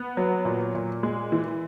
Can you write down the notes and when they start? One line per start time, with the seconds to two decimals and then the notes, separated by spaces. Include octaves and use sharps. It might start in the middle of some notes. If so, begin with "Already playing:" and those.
Already playing: B3
0.17 F#3
0.45 A#2
0.75 A#2
1.03 G#3
1.32 E3